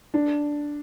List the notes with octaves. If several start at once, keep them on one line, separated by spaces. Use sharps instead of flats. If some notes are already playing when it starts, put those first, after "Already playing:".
D4